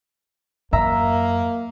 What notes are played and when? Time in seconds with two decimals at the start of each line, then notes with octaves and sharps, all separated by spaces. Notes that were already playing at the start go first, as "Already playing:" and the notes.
0.73 F#2 A#3 E5 A#5